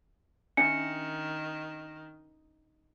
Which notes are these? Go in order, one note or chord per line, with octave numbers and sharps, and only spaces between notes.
D#3 C#4 D4 E5 C#7